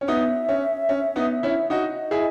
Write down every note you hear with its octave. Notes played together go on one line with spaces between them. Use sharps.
C#4
B3 D#4 E5
C#4
C#4
B3 D#4
C#4 E4
D#4 F#4 D#5
E4 G#4